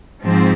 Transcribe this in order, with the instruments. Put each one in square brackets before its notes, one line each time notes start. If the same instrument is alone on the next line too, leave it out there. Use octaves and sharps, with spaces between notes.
[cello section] G#2 F3 G#3 C4